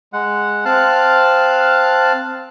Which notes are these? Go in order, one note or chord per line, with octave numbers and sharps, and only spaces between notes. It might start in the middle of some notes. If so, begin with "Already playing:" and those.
G#3 F#5
C4 F5 A5 F6 F#6